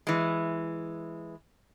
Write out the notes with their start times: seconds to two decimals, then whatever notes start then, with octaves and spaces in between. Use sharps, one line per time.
0.07 E3 G#3